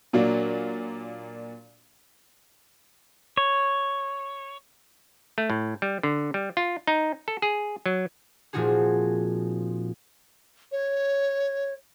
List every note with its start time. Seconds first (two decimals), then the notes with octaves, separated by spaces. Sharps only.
0.13 A#2 F#3 A#3 D4
3.37 C#5
5.38 A3
5.50 A2
5.82 G3
6.03 D3
6.34 G3
6.57 F4
6.87 D#4
7.28 A4
7.42 G#4
7.86 F#3
8.53 A#2 F3 C4 D#4 F#4 G#4
10.71 C#5